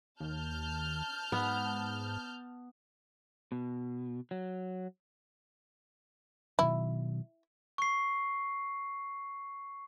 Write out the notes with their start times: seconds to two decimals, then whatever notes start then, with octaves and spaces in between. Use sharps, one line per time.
0.20 D#2 A5 F6 G6
1.32 G#2 B3
3.52 B2
4.31 F#3
6.59 B2 D#3 F#3 E4
7.78 C#6 C7